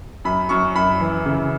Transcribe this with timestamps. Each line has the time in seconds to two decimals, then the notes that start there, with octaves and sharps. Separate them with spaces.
0.25 F#2 B5
0.49 F#2 C#6
0.75 F#2 B5
1.00 E3
1.26 C#3